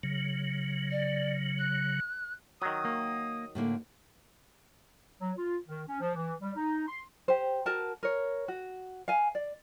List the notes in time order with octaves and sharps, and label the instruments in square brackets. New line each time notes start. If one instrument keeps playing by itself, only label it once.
[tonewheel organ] C#3 F#3
[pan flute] D5
F#6
[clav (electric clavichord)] D#3 F#3 [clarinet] D#6
[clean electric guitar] A#3
[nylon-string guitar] A2 D3 A#3
[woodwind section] F#3
F4
D#3
C#4
F3
E3
G3
D#4
C6
[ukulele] G4 C5
F#4 A#4 A5
A#4 C#5
F#4
F5 G#5
D5